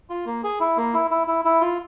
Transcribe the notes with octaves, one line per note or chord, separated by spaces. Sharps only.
F4
A#3
G#4
E4
A#3
E4
E4
E4
E4
F4